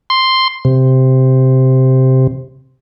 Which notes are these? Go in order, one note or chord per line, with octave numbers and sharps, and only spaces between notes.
C6
C3